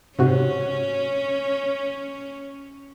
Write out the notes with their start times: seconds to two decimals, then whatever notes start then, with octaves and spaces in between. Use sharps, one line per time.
0.19 G#2 C3 C#4 F#4